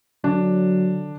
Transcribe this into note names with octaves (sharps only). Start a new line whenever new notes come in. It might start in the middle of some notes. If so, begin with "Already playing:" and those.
D3 F#3 D4